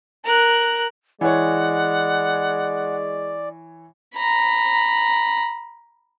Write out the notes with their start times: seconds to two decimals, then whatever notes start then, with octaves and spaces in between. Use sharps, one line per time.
0.24 A#4 F#6
1.21 E3 G#3 C#5 D5 F#5
4.15 A#5 B5